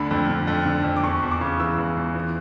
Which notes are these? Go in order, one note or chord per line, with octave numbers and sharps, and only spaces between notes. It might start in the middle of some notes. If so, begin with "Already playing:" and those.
Already playing: D2 D3 B5
F2
D3
F2
D3
F2
D6
E2 C#6
E2
D6
C#3
E3 E6
E2
E2
E3